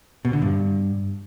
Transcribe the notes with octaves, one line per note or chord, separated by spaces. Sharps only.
B2
D3
G2